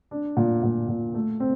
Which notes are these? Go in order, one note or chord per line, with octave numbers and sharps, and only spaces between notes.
D4
A#2
A#2
A#2
A3
C4